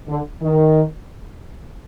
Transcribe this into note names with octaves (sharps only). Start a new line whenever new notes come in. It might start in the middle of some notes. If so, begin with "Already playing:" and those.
D3
D#3